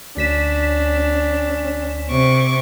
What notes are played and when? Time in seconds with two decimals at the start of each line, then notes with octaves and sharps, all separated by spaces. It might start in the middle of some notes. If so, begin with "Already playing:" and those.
0.17 D2 C#4 D4 B6 E7
2.10 C3 C#6 D6